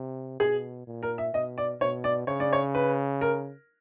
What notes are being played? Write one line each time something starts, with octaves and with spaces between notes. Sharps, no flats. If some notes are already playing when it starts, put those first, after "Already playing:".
Already playing: C3
B2 G#4
A#2
A#4
E5
B2 D#5
D5
B2 C#5
D5
C#3 C#5
D5
C#5
B4
A#4